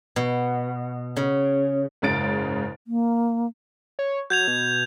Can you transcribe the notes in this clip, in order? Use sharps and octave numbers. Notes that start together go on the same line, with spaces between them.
B2
C#3
F#1 G#2 C#3 A6 D7
A#3
C#5
F#3 G6 G#6 F7
B2